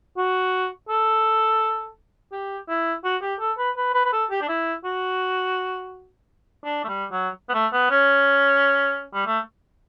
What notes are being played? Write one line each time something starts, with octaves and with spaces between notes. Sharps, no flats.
F#4
A4
G4
E4
F#4
G4
A4
B4
B4
B4
B4
A4
G4
D4
E4
F#4
D4
A3
G3
F#3
B3
A3
B3
C#4
G3
A3